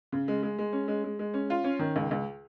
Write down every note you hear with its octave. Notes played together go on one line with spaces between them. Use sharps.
C#3
G#3
G#3
G#3
C#4
G#3
G#3
G#3
C#4
F4
C#4
D#3
C#2
C#2